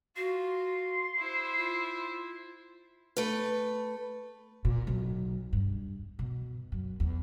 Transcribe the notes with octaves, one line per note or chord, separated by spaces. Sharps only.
F4 F#4 C6
E4 C5
F4
A3 B4
A#2
B1
G2
B2
F#2
E2